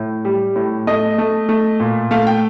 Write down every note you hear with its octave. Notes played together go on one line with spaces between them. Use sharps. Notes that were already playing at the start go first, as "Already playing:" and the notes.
Already playing: A2
G3
A2
A3 D#5
A3
A3
A#2
A3 F5
G5